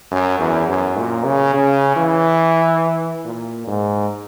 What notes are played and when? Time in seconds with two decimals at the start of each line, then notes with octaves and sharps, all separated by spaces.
0.11 F#2
0.39 E2
0.68 F#2
0.97 A#2
1.25 C#3
1.54 C#3
1.96 E3
3.25 A#2
3.67 G#2